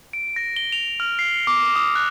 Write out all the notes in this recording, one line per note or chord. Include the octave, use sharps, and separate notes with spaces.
D7
A#6
G7
F7
F6
C7
C#7
D6
D#6
F#6